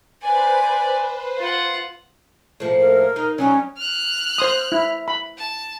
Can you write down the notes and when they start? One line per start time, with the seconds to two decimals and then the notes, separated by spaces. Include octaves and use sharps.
0.22 B4 C5 D5 G#5
1.38 F4 F#5
2.60 A2 F3 A#3
2.80 A#4
3.16 D#4
3.38 F#3 G3 C#4 D#4
3.77 F6 F#6
4.38 C5 C6 D#6
4.72 E4
5.08 B5
5.38 A5